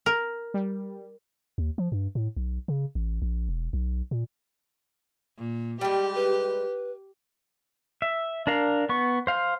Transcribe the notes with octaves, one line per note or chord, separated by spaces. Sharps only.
A#4
G3
D#2
F3
G2
A2
B1
C#3
A1
A#1
E1
B1
A#2
A#2
G3 G#3 G4 G5
B4
E5
D4 A#4 F5
B3 C#6
C5 F5